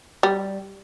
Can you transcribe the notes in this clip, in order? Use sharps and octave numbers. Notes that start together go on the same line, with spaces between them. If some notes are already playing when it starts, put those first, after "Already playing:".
G3